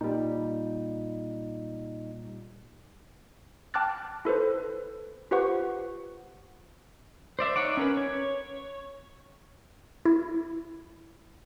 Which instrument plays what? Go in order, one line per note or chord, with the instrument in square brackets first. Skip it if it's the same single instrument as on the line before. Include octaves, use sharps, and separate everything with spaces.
[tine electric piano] A#2 G3 [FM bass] D#4
[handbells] G5 A5 D6 F6 F#6 A6
E4 A4 B4 C5
F4 G4 B4 C5 F#5 C#6
[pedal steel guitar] C5 D5 E5
D#4 C#5 F#5 D6
C#4 A#4 B4
C#5
[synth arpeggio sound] E4